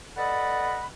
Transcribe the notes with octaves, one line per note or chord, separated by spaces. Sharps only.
A4 B4 D5 D#5 F#5 B5